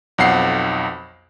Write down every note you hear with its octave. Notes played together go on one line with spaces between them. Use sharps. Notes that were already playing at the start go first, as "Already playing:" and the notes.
B1 F2 F#5 C7